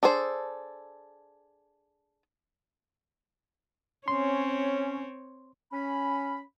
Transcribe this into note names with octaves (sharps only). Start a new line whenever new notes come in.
D4 G#4 A4 C5
C4 C#4 C#5 C6
C#4 B5